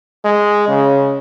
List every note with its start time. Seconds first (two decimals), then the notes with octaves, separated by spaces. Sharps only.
0.24 G#3
0.68 C#3